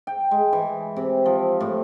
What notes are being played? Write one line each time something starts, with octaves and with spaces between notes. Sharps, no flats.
G5
G#3
E3
C3
F3
A2